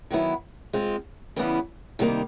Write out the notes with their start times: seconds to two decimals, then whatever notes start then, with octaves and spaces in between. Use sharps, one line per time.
0.11 D#3 F#3 B3 E4
0.73 G#3 C4 F4
1.36 C#3 E3 G3 B3 E4
1.99 C3 D#3 G3 A#3 D#4